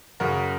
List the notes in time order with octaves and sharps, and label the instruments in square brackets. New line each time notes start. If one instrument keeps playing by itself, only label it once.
[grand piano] F#2 C#3 F#4 A#4